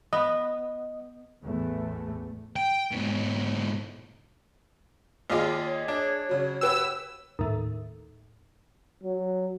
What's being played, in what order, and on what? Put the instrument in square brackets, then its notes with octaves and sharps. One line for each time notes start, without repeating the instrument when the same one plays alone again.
[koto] B3 [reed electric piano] D#5
[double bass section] A1 E2 A2 A3
[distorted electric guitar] G5
G#2 B2
[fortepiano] D#2 F4 [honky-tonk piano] G#4 D5 D#5
[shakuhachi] C#5
[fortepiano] D4
[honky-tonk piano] C#3 F#3
[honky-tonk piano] F#4 G4 B4 [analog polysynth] E6
[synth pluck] D#2 A2
[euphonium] F#3